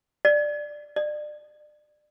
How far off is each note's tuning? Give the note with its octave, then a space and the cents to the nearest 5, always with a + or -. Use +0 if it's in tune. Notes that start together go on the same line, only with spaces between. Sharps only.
D5 +10
D5 +30